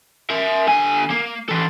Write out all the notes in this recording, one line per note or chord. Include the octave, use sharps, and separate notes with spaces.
A#4 E5
D3 G#5
A#3
E3 A4